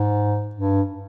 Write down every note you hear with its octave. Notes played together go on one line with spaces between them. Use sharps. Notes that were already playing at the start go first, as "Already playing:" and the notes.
Already playing: G#2
G2